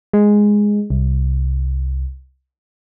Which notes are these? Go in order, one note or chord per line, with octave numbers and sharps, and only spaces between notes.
G#3
C2